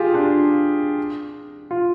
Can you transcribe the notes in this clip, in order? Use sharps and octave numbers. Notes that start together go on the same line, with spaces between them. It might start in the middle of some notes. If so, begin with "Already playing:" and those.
Already playing: F4 G4 G#4
D4 F4
F4